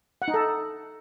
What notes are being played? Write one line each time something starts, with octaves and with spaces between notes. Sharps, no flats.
F#5
D#4
A4